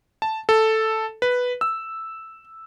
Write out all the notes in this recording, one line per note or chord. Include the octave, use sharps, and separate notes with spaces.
A5
A4
B4
E6